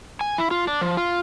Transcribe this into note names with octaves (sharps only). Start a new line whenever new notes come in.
G#5
E4
F4
D4
F3
F4